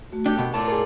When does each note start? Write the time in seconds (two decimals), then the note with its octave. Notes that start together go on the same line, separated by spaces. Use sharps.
0.12 A3 F#4
0.26 D4 G4 A4 G5
0.38 B2 B3 A#4
0.54 A2 F4 A4 D5 A5
0.68 G#4 A#4